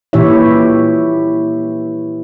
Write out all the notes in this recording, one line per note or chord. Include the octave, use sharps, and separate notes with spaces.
A#2 E3 E4 G4 C#5 E5